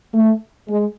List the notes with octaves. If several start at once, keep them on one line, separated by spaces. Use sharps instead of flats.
A3
G#3